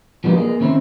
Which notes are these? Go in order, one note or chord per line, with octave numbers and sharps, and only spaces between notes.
F3 G3 A#3 B3 D4 D#4
A#3 G#4 D#5
D#3 C4 C#4 D#4 E4 C5